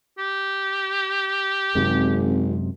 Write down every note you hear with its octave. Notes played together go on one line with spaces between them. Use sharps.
G4
G#1 F#2 C3 G#3